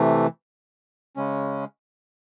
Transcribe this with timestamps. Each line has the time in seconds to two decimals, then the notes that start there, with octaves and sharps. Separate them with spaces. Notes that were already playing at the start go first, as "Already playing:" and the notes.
Already playing: C3 E3 A3
1.16 C#3 G#3 C#4